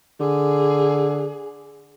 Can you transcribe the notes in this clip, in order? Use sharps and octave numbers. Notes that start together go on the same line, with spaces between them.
D3 G#4